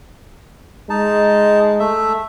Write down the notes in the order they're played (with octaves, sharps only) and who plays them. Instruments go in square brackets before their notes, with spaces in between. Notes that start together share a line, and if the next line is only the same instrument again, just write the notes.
[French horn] G#3 [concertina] D#4 A5
[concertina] A3 E5